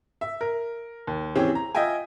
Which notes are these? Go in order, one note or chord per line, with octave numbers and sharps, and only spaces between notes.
E5
A#4
D#2
E3 C4 C#4 G4 G#4
A#5
F4 D#5 E5 G5 G#5